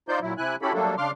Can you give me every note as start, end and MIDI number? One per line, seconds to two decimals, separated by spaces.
0.09 0.19 63
0.09 0.19 65
0.09 0.19 72
0.09 0.19 74
0.09 0.19 91
0.22 0.34 46
0.22 0.34 54
0.22 0.34 64
0.38 0.56 48
0.38 0.56 64
0.38 0.56 80
0.38 0.56 90
0.62 0.73 61
0.62 0.73 64
0.62 0.73 66
0.62 0.73 67
0.62 0.73 69
0.62 0.73 83
0.73 0.95 54
0.73 0.95 55
0.73 0.95 57
0.73 0.95 58
0.73 0.95 62
0.73 0.95 69
0.98 1.11 49
0.98 1.11 62
0.98 1.11 77
0.98 1.11 84
0.98 1.11 86
0.98 1.11 89